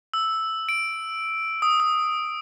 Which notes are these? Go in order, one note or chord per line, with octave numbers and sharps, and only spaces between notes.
E6
D7
D#6
D#6